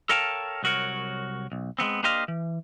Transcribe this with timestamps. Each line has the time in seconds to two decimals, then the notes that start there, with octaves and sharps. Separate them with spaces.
0.09 A4 A#4 C#5 F5 G5 A5
0.63 C2 F#3 F#4 A#4 C#5
1.52 B1
1.79 G#3 A3 B3 C4
2.03 A#3 D4 G4 C5 D#5 F5
2.28 E3